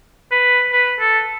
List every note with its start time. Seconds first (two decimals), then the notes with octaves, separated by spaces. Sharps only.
0.31 B4
0.72 B4
1.00 A4